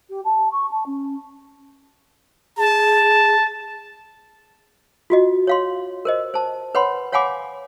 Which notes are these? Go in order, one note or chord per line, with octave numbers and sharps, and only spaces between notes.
G4
A5
C#6
A5
C#4
G#4 A5
F4 F#4 D#5
C#5 F5 C6
A#4 C5 D#5
C5 A5
B4 C#5 F#5 B5 C6
C#5 F5 F#5 G#5 B5 D6